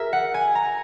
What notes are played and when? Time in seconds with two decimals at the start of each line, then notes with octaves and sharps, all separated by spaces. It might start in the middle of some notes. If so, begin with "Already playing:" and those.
Already playing: F#4 G#4 A#4 E5
0.13 F#5
0.34 G#5
0.55 A#5